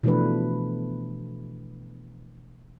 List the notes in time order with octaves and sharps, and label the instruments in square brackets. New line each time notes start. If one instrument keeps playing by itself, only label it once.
[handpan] B2 E3 F3 A3 D4 B4